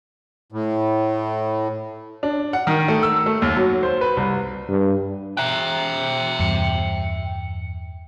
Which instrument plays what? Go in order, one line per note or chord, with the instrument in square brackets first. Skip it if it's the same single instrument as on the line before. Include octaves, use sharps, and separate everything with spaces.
[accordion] A2
[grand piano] D4
F#5
D#3
A3
E6
A3
D#2
F#3
C5
B4
C2
[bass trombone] G2
[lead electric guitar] E5 G5 [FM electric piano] A#5 F#6
[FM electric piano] E2 G2 C#7